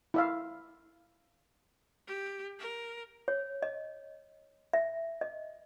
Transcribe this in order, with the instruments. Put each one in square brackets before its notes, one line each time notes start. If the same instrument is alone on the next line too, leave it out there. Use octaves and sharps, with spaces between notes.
[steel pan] E4 E5 F5
[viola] G4
A#4
[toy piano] C#5
D#5
E5
D#5